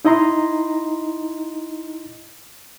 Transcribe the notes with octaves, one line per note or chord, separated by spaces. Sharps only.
D#4 E4 D#5 A#5 C6